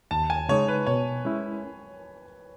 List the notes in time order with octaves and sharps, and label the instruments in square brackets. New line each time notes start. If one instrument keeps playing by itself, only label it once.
[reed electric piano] D#2 [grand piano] A5
[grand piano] G#5
[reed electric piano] C#3 G#3 D#4 [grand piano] C#5
[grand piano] B4
[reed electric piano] B2 [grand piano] C#5
[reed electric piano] G#3 C#4 E4